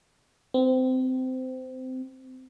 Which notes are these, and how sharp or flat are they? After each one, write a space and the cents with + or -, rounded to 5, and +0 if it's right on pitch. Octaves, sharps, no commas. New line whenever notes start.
C4 -25